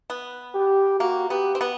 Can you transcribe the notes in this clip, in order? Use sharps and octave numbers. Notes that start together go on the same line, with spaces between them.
B3
G4
A#3 F#4
B3 G4
C4
B3